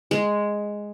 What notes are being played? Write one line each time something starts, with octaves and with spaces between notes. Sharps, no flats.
G#3